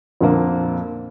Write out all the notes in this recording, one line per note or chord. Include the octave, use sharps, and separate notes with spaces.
F2 A#2 D3 F3 A#3